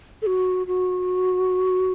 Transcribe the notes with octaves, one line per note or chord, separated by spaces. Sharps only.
A4
F#4
F#4